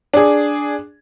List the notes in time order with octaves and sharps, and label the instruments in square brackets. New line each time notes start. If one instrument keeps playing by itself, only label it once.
[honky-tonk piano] D4 G#4